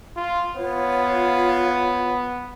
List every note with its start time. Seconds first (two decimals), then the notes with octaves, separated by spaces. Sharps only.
0.16 F4
0.56 B3 F4 C#5